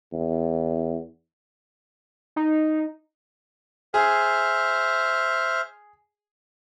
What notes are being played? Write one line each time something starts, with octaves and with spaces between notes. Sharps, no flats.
E2
D#4
G#4 C5 E5 F6